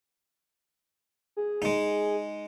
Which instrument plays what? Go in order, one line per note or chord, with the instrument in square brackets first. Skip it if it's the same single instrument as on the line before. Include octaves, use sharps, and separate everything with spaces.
[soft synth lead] G#4
[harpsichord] G#3 D#4